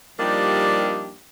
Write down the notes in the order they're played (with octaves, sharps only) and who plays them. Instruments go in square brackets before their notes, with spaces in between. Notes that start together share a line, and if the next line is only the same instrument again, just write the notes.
[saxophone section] F3 G3 A#3 D4 D#4 G4